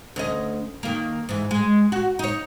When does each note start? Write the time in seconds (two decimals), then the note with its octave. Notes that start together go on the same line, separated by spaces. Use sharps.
0.16 D2 C#4 D#5
0.83 D#3 A#3
1.29 G#2 E3
1.51 G#3
1.92 F#4
2.19 D#4 C#5